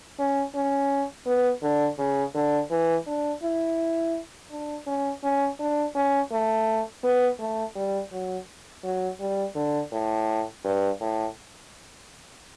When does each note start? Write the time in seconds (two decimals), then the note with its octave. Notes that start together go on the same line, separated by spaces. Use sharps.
0.19 C#4
0.54 C#4
1.26 B3
1.62 D3
1.98 C#3
2.34 D3
2.71 E3
3.07 D4
3.43 E4
4.51 D4
4.86 C#4
5.23 C#4
5.59 D4
5.95 C#4
6.31 A3
7.04 B3
7.39 A3
7.75 G3
8.12 F#3
8.84 F#3
9.20 G3
9.55 D3
9.92 A2
10.64 G2
11.00 A2